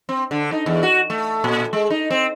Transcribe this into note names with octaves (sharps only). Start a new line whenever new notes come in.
C4
D3
D#4
E2
F#4
A3
A#2
G#3
D#4
C4